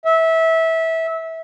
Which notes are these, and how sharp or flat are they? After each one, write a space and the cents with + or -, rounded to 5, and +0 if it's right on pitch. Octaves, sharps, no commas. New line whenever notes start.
E5 -20